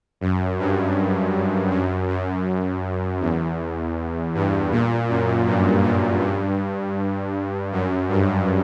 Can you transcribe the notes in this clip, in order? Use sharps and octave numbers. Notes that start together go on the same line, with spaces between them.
F#2
G2
F#2
F#2
E2
G2
A#2
F#2
G2
A#2
G2
F#2
G2